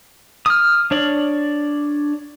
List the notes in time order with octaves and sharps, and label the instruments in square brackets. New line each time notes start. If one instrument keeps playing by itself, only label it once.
[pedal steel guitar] D#6 F6
D4 C#5 D5